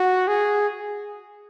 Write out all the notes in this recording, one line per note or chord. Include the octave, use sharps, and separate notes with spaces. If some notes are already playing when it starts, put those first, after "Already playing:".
Already playing: F#4
G#4